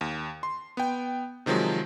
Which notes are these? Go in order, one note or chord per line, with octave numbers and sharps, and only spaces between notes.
D#2
C6
B3 G5
C3 D#3 F3 F#3 G#3